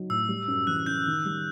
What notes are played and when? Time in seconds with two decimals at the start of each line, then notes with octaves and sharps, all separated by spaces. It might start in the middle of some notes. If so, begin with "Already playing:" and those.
Already playing: F#3 D#4
0.10 A2 E6
0.29 G3
0.48 F#2
0.67 E3 F#6
0.86 F#2 G6
1.06 D#3
1.25 G3